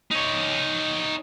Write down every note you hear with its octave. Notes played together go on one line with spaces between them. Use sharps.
D#4 C#5